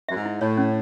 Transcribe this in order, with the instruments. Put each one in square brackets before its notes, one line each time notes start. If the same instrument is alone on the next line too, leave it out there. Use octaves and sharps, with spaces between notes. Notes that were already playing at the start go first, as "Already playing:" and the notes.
[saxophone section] F#2 [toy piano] E5
[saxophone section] G#2
[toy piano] E4
[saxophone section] A2 [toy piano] C#5
[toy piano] C#4